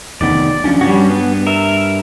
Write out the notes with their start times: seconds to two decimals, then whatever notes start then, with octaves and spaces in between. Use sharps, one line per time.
0.21 F1 D#3 B3 D5
0.64 F3 C#4 D4
0.81 G2 G3 C#4 F#4
1.10 B3
1.47 A#4 E5